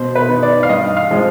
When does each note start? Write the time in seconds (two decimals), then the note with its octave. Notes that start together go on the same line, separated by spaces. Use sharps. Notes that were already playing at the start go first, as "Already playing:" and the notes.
Already playing: B2 C5
0.15 B4
0.29 B3 D#4
0.43 D5
0.63 F5
0.69 G2 D#5
0.97 F5
1.11 F3 G#3 C4